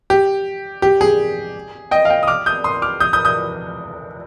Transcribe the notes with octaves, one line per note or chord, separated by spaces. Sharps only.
G4
G4
G#4
D#5 G5
F5
D#5 G5
D#6
D6 F6
D#6 G6
C6 D#6
D6 F6
D#6 G6
D#6 G6
D#6 G6